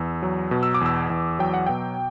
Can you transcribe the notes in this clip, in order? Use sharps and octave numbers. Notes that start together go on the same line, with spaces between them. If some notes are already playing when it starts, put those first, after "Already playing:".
Already playing: E2 E6
F#3
B2
E6
D6
E2 E6
E2
F#3 G5
F#5
B2 G5